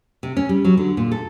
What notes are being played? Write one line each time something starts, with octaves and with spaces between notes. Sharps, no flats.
C3
C#4
G3
F#3
D3
A#2
A4